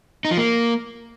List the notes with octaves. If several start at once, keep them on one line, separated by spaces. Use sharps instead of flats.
D#4
F3
A#3